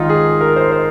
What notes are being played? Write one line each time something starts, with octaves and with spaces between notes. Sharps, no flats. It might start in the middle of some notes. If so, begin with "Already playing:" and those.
Already playing: G#1 G#2 D#3 D#4 F4
G#4
A#4
C5
C5